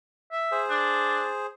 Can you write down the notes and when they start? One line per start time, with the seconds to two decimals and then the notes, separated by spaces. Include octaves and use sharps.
0.32 E5
0.52 G#4 C5
0.70 D4